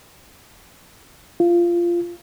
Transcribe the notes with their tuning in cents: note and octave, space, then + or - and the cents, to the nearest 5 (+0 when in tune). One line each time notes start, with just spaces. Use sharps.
F4 -15